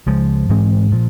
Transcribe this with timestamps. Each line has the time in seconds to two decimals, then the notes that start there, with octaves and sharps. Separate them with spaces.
0.06 C#2 C#3 F3 G#3
0.49 G#2 E3 G#3 C4
0.91 A#2 F3